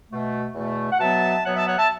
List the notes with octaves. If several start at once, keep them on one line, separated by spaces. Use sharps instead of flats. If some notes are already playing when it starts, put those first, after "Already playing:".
B2 A3
E2 B2 A3
F#5
B2 F#3 B3 E5 A5
B2 F#3 B3 C#5 F#5
E5 A5
C#5 F#5
E5 A5